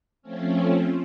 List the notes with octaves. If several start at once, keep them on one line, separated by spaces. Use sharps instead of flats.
F3 A3 C4 C#4